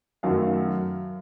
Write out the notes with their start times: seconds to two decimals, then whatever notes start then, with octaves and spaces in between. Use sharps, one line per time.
0.23 F#2 D#3 F#3 A3 F5